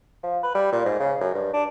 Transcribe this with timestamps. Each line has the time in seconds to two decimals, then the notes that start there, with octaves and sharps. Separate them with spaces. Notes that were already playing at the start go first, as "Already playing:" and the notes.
0.23 F3
0.43 B4
0.55 G3
0.72 A#2
0.85 G#2
0.99 C#3
1.21 F#2
1.34 G2
1.53 D4